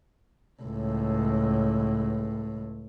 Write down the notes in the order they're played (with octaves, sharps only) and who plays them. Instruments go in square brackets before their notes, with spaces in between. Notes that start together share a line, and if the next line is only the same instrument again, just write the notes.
[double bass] C#2 A2